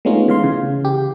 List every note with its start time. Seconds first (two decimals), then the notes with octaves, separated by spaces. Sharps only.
0.05 G#3 A3 B3 C#4 D#4 F4
0.28 E3 F5 C6
0.44 C#3
0.85 G4